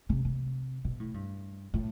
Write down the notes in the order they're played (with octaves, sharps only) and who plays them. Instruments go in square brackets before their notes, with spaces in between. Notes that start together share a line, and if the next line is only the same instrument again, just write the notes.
[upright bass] C3
C3
B2
A2
G2
A2